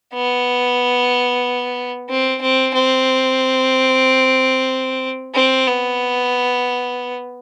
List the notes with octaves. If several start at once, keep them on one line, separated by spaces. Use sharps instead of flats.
B3
C4
C4
C4
C4
B3